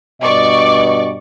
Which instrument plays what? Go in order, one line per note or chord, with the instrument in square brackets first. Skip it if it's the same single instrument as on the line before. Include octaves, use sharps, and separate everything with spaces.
[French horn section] G2 B2 D#5 [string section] D5 C#6 D6